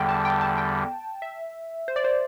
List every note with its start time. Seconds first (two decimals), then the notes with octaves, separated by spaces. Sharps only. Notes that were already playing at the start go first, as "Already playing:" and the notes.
Already playing: E2 D3 G3 G5
0.09 A5
0.25 G5
0.41 A5
0.57 G5
1.22 E5
1.88 C5
1.96 D5
2.04 C5